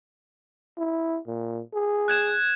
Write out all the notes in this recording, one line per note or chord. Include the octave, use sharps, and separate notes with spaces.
E4
A#2
G#4
F#6 G#6 E7